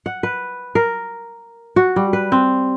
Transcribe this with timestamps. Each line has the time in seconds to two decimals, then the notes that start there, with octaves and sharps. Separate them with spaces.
0.06 F#5
0.23 B4
0.75 A#4
1.76 F#4
1.96 G3
2.13 B4
2.32 C4